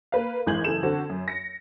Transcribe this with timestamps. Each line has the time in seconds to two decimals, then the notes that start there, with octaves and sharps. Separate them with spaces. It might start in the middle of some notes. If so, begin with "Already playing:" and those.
0.12 A#3 B4 F5
0.46 G#1 E3 G#3 G6 G#6 F#7
0.64 F#1 E3 G#4 A4 E7
0.83 D3 C4 F#4 A4
1.09 F#2
1.28 A#6 C#7